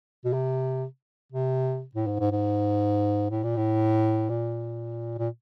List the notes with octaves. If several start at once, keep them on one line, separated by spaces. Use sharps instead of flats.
B2
C3
C3
A2
G#2
G#2
G#2
A2
A#2
A2
A#2
A#2